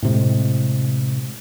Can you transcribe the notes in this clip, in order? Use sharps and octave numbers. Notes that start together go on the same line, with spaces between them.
A2 C3 G#3